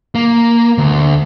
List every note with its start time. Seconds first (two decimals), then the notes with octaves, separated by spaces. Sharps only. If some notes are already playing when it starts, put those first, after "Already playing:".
0.15 A#3
0.78 D2